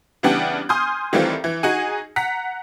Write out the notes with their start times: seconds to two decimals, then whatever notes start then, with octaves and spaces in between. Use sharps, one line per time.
0.23 C#3 E3 G3 B3 D4 G4
0.69 G#5 C6 D#6 F6 G6
1.13 D#3 E3 G3 A3 C4 F4
1.44 E3
1.63 D#4 F#4 G#4 G#5
2.16 F#5 A#5 B6